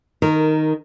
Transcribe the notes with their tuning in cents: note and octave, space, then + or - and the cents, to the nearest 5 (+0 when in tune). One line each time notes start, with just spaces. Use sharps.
D#3 +0 A#4 -10